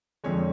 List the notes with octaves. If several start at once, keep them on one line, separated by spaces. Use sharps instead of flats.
F2 D3 F3 G#3 C#5